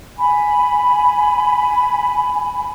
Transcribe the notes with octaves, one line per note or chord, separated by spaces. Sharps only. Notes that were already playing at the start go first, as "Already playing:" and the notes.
G#5 B5